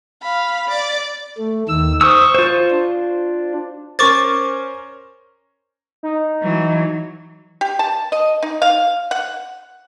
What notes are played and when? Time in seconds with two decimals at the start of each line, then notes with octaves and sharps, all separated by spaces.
0.23 F5 B5
0.68 D5
1.38 A3
1.69 D#2 D#3 E6
2.01 C5 C#6 D#6 E6
2.35 F4 C5
2.70 D4
3.99 C#4 A#4 C5 C#6 D6 A6
6.03 D#4
6.42 E3 F#3
7.61 G4
7.79 A5
8.12 D#5
8.43 D#4
8.62 F5
9.11 F#5